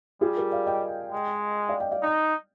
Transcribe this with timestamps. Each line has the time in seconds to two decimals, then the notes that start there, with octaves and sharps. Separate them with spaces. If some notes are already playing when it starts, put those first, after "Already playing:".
0.21 G3 F4 G#4
0.37 G4 A#4
0.52 D5 F5
0.67 D#5 G5
1.12 G#3
1.69 D5 F5
1.80 D#5 G5
1.91 D5 F5
2.03 D#4